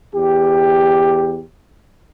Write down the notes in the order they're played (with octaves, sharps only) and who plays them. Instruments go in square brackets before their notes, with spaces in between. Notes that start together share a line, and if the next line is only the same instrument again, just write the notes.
[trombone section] E2 G4